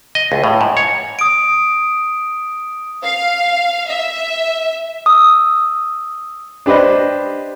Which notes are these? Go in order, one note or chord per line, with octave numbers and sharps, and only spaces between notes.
D#5
C#2
A2
G#2
C#5
D#6 D7
F5
E5
D#6 E6
D4 G4 B4 C5 D#5